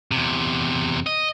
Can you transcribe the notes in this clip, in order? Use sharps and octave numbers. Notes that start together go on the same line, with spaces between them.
E2 C3
D#5